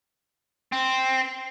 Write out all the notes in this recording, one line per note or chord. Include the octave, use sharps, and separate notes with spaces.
C4